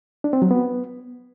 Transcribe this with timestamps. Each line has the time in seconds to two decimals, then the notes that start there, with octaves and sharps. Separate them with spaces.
0.24 D4
0.33 C4
0.42 F#3
0.51 B3